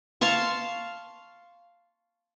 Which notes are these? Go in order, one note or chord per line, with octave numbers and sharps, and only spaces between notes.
F5 A5 C6 C#6